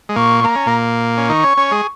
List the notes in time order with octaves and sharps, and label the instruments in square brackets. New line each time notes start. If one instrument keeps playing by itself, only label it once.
[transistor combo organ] G#3
[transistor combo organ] A#2 A#3 [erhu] C#6
[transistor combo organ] A#3 [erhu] A#5
[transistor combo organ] C#4
A#2 A#3
C#4
[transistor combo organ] D#3 D#4 [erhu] C#6
[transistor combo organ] C#4 C#5
C#4 C#5
G#3 G#4